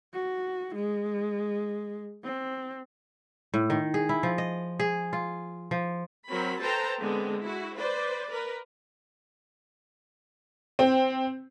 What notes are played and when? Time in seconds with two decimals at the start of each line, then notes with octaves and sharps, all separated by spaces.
0.14 F#4
0.75 G#3
2.24 C4
3.54 A2
3.70 D#3
3.94 G#4
4.09 E4
4.23 F3
4.38 D#5
4.80 G#4
5.13 F4
5.71 F3
6.28 F#3 C4 A#4 B5
6.59 A4 B4 C5 G5 A5 A#5
7.00 D3 G#3 B3 C4
7.40 E4 F#4
7.76 B4 C5 D5
8.30 A#4 B4
10.79 C4